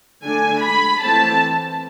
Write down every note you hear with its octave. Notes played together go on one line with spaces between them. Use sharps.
D3 A3 D4 G#5
B5
E3 A3 C4 A5